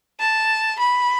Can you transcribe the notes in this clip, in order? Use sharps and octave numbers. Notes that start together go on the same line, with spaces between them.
A5
B5